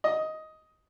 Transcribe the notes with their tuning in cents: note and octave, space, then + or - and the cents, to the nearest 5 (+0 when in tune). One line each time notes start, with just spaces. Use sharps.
D#5 +10